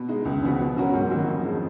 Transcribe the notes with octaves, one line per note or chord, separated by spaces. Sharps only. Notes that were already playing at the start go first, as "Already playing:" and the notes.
Already playing: B2
G#3 D#4
C#2
C#3 F3 B3 F#4
B2
F#3 C#4 F#4 A#4
G#2
D#3 F#3 A#3
F2
F3 G#3